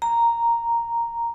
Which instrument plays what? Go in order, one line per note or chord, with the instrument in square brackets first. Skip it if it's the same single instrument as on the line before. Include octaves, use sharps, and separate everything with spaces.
[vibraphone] A#5